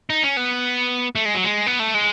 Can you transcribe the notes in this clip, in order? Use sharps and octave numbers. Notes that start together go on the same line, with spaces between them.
D#4
C#4
B3
A3
G#3
F#3
G#3
B3
A3
G#3